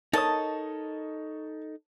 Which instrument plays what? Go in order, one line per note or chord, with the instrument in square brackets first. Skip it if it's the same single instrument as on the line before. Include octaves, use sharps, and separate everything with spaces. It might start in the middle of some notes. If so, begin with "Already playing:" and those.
[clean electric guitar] D#4 A4 D#5 [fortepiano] A#4 C#5 D#6 [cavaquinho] A5